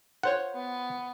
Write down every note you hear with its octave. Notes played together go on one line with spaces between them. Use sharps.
F4 C5 C#5 F#5
B3